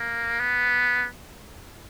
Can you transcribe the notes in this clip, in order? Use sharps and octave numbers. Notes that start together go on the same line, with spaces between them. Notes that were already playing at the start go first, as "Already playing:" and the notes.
Already playing: A#3
B3